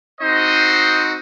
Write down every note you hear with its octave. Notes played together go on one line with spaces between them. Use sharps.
C4 D#4 F#4 C5 D#5